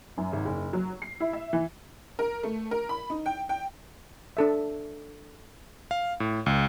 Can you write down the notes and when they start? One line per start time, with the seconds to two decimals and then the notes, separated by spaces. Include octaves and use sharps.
0.17 F#2
0.33 G#1
0.45 F#1
0.73 F#3
1.02 C7
1.20 E4
1.33 E5
1.53 E3
2.19 A#4
2.43 A3
2.71 A#4
2.89 B5
3.10 D#4
3.26 G5
3.49 G5
4.37 D4 A4 E5
5.91 F5
6.20 A2
6.46 C#2